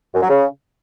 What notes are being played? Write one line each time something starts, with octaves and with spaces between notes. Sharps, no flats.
F#2
F#3
C#3